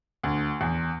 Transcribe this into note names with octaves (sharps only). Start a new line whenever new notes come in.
D2
E2